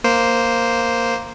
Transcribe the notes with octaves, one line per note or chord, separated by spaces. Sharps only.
A#3 C5